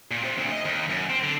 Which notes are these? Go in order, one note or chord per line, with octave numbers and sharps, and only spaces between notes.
A#2
C3
D2
D#5
D#2
F#2
C4
D3